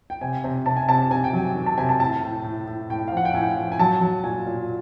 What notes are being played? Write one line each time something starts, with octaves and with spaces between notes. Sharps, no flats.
G5
C3 G#5
C3
C3 A5
G#5
C3 A5
C3 G#5
G5
F#3 G#5
D#3
A5
C3 G#5
A5
A2 A5
A2
A2
A2
A2 G5
F5
F3 F#5
G5
A2 G#5
F3
G#5
F#3 A5
F#3
A#2 G#5
A#2